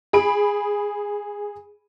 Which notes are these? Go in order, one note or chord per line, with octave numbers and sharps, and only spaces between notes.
G#4 B5 D7